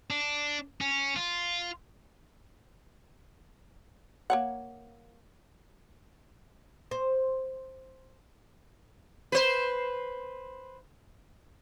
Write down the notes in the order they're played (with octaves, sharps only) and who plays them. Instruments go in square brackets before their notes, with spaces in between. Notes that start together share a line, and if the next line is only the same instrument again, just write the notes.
[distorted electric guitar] D4
C#4
F4
[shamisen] A#3 C#5 F#5
[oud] C5
[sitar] B4 C5